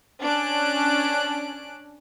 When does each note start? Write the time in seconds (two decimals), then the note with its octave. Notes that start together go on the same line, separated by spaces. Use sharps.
0.23 C#4 D4 F#6 D7